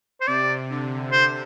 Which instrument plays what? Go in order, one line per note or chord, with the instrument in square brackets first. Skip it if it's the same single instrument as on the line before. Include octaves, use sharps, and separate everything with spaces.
[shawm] C5
[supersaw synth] C3 [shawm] D5
[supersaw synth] D3
[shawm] C5